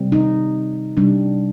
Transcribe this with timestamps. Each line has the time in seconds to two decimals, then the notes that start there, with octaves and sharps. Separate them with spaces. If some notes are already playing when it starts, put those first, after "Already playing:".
Already playing: C3 G3 C4
0.12 D#4
0.97 C3 G3 D4